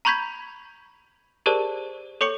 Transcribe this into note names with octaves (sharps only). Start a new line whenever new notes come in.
A#5 B5 C#6 G6 G#6 B6
G4 G#4 A#4 C5 D5 A5
A4 C#5 C#6 C#7